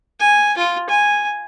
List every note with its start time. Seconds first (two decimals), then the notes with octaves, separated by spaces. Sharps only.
0.20 G#5
0.57 F4
0.89 G#5